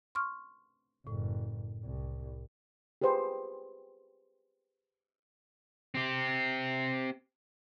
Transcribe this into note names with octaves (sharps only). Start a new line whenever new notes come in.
C6 C#6 F6
F#1 A2
C2
G4 G#4 B4 C5
C4 G4